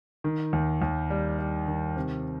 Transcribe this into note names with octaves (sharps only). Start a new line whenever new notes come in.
D#3
D#2
D#2
G3
G3
D#3
C3